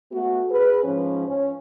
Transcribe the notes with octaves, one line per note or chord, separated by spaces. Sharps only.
A3 B3 F#4
G#4 B4
G#2 F3 C#4
C#4